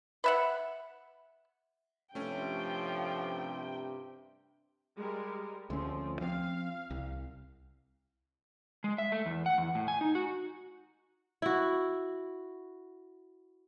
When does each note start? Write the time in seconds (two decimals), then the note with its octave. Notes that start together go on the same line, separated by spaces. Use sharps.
0.24 B4 E5 F#5
2.15 G2 C3 F3 A3 C#4 G5
4.97 G3 G#3 A#4
5.70 D2 F3 A3 C4 C#4
6.21 F3 C4 F5
6.90 C2
8.84 G#3
8.98 E5
9.12 A3
9.26 E2
9.46 F#5
9.58 E2
9.75 A2
9.88 G#5
10.01 D#4
10.15 F#4
11.42 E4 F#4